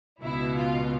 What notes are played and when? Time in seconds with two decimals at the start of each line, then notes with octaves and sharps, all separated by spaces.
0.21 C#2 B2 E4
0.56 F4